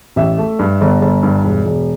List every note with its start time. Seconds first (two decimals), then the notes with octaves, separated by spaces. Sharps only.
0.16 A1 E5
0.38 A3
0.59 G2
0.81 G1
1.02 G1
1.23 G2
1.44 E1
1.66 E1